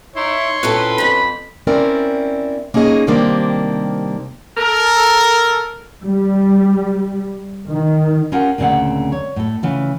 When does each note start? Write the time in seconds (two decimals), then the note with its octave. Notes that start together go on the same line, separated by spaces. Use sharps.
0.16 D#4 E4 C#5 C6
0.63 A#2 C4 C#4 E4 A4 B4
0.98 F2 C5 B5
1.67 C4 C#4 E4 A#4 D5
2.74 A#3 C#4 D#4 G#4 D#5
3.07 C3 D#3 G3 A#3 C4 D4
4.57 A4 A#4
6.04 G3
7.70 D#3
8.32 C#4 F4 G4 A#4 F#5
8.58 D2 A#2 C#3 F3 C4 F#5
9.12 C#5
9.36 A2 A4
9.63 C#3 E3 F4